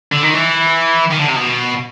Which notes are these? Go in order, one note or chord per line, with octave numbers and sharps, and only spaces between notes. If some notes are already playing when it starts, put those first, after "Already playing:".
D3
D#3
E3
D#3
D3
C3
B2